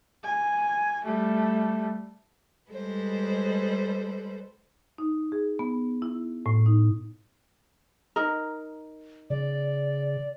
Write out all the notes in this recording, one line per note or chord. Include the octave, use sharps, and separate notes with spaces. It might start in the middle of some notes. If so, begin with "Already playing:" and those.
G#5
G3 A3
G3 G#3 A4 B4 C5
D#4
G#4
B3
E4
A2
D#4
D#4 A#4
C#3 D5